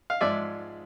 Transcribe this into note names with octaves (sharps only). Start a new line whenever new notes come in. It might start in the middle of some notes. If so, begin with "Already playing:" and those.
F5
G#2 F3 G#3 D5 E5